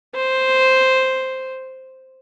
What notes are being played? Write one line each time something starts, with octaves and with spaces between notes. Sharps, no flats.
C5